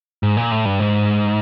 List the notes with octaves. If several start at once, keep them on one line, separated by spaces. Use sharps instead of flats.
G#2
A#2
A2
G2
G#2